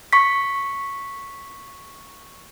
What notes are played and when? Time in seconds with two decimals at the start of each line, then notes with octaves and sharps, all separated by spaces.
0.13 C#6 B6